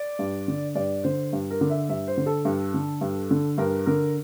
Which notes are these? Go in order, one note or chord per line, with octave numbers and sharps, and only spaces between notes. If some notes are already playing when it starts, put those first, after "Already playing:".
Already playing: D5
G2
D3
G2 D5
D3 C5
G2
A#4
D3
E5
G2 E5
C5
D3
A4
G2
D3
G2
D3
G2 A#4
D3 A#4